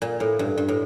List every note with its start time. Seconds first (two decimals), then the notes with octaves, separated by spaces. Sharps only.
0.02 A#2
0.20 A2
0.39 G2
0.58 G2
0.68 A2